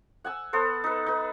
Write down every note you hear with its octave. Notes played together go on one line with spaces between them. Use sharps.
F#5 G#5 E6
B3 A4 C5
D#4 B4
D#4 B4